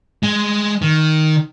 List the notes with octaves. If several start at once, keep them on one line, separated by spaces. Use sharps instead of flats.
G#3
D#3